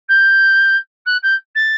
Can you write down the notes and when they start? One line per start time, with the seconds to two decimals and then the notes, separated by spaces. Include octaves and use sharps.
0.08 G6
1.05 F#6
1.22 G6
1.55 A6